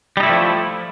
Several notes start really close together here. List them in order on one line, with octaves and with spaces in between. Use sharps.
G3 D#4 E4 A3 F3